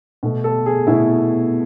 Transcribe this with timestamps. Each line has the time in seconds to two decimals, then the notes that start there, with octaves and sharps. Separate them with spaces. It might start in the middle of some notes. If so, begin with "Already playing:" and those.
0.23 B2 A3
0.44 A4
0.66 G#4
0.87 B2 A3 E4